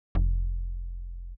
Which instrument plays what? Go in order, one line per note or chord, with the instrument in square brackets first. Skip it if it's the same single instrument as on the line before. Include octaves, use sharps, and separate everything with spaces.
[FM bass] F1